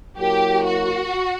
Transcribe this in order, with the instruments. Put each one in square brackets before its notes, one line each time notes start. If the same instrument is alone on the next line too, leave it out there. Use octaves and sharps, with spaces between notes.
[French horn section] F#3 A#3 E4 A#4 [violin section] G4
[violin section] F#4